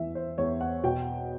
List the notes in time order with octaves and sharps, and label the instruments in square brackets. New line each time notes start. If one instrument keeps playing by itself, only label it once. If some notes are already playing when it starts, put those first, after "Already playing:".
Already playing: [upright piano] E2 E3 E5
C5
E2 C#5
F#5
B2 G5